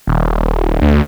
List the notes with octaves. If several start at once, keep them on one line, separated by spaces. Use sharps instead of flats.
D#1
D2